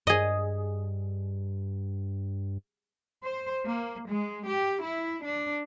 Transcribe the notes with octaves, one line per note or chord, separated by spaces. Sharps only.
G2 G#4 D#5
C5
A#3
G#3
G4
E4
D4